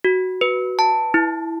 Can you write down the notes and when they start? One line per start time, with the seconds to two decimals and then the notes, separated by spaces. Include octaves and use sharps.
0.04 F#4
0.41 B4
0.79 A5
1.14 E4